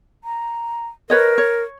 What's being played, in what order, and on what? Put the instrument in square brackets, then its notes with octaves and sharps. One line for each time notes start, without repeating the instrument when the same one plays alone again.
[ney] A#5
[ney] A#4 [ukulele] B4 C#5 D#5
[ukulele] C#5